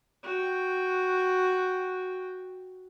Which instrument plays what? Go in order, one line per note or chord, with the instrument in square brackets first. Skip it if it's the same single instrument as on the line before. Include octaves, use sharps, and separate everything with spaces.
[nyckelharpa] F#4 G5